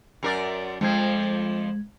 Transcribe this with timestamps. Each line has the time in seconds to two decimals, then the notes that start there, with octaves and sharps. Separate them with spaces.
0.23 F#2 A#4 D5
0.81 F2 F3 G#3 G#6